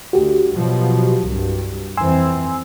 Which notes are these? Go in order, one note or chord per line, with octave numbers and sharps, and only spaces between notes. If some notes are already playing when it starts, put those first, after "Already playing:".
D2 F#4 G4
B2 F3 F#3
C2 G2
F2 E3 C4 G#5 C6 E6